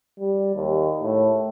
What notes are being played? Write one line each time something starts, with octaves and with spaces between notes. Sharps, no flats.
G3
D#2
A2